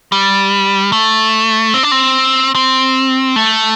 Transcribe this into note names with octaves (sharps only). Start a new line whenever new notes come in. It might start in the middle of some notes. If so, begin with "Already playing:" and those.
G3
A3
C4
D4
C4
C4
A3